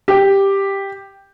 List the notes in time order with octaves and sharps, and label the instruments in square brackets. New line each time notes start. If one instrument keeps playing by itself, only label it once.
[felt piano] G4